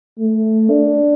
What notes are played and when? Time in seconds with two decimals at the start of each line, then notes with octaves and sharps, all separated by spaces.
0.19 A3
0.70 D4